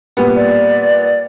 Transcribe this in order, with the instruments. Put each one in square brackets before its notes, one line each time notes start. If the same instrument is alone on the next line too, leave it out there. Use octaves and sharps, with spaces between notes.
[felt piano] A#2 G3 B3
[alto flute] D5